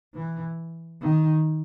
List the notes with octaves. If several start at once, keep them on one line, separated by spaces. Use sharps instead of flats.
E3
D#3